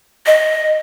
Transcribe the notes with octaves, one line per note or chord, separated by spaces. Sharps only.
D#5